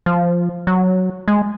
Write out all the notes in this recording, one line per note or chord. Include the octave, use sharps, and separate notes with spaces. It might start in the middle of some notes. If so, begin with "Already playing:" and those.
F3
F#3
G#3